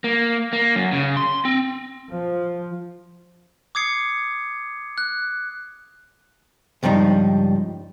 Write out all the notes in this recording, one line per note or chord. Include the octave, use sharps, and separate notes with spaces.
A#3
A#3
F#2
C#3
C6
C4
F3
D6 D#6 G#6 C7 C#7
F#6
C#2 G2 F3 G3 D#4